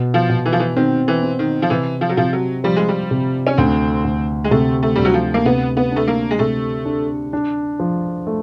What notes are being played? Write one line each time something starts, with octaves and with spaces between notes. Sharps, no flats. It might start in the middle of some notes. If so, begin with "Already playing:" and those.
Already playing: B2
F3
B2
E3
F3
E3
D#3 C4
E3
C4
D#3
F3
C3 E3
F3
F#3
C3 F3
F#3
F3 G3
G#3
G3
C3
C#4
D2 C4
D2
G#3
C3 A3
A3
D2 G3
F#3
F3
A#3
C3 B3
B3
A3 D4
A#3
G#3
C3 A3
D4
D4
F3
A3